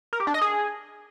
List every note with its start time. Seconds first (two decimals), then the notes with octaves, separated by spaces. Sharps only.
0.13 A#4
0.20 G4
0.27 D4
0.34 D#5
0.41 G#4